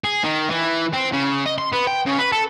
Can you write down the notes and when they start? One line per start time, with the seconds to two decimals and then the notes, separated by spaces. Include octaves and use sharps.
0.04 G#4
0.24 D#3
0.51 E3
0.93 C4
1.12 C#3
1.46 D#5
1.58 C6
1.73 B3
1.87 G5
2.06 C#3
2.19 B4
2.33 A4